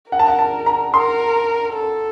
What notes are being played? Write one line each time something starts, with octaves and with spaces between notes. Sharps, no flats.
A#4 F#5
A5
F#5
A5
A#5
A#4 C6
A4